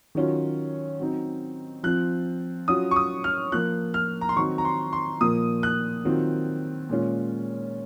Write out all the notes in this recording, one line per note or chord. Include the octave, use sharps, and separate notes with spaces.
D#3 F#3 C#4 F4
F#3 C4 D#4
F3 C4 F4 F#6
F#3 C#4 F4 D#6
C#6
D#6
F6
F3 A#3 F4 F#6
F6
A#5
C6
D#3 F#3 C4 D#4 C#6
A#5
C6
C6
A#2 F3 A#3 F4 D#6
F#6
D#3 F#3 C4 F4
A#2 G#3 C#4 F4